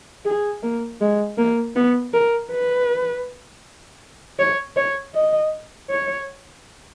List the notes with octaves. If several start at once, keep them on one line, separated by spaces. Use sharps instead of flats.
G#4
A#3
G#3
A#3
B3
A#4
B4
C#5
C#5
D#5
C#5